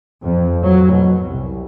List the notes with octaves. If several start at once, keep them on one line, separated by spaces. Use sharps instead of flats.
F2
F#3
B2
C2